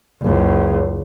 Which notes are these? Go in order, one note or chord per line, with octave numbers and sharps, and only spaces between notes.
F#1 C#2